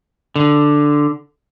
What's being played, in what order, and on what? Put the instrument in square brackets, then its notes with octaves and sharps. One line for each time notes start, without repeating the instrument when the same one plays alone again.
[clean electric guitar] D3